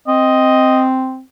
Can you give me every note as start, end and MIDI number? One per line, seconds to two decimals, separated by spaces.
0.08 1.22 60
0.08 0.84 75